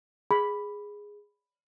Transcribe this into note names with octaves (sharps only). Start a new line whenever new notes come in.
G#4 B5